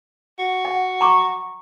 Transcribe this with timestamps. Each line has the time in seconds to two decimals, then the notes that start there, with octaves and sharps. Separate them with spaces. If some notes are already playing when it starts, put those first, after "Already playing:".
0.39 F#4
0.65 F#5
1.01 A#5 C#6 D6